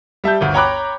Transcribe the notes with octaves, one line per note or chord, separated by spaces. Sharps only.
G3 E5 A5 G6
G1 D2
C#5 G5 A#5 B5 D6 F#6